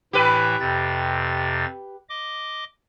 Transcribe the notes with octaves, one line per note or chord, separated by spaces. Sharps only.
A2 E3 E4 G4 B4
F2 C3 A6
D#5 D6